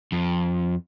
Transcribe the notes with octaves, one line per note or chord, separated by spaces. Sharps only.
F2